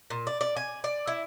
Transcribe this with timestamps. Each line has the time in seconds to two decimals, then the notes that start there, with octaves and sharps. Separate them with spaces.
0.10 A#2
0.27 D5
0.41 D5
0.57 G#5
0.84 D5
1.07 E4